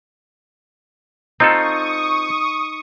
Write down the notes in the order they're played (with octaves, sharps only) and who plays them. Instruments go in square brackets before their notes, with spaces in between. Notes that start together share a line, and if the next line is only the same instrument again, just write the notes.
[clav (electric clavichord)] C4 F4 A4 [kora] D#4 [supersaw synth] C#6 D#6